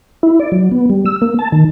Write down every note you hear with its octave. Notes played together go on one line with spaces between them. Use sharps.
E4
D5
F#3
B3
G3
E6
A#3
A5
D#3